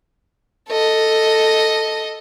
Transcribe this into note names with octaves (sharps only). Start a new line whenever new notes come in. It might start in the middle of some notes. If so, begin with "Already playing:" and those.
A4 D#5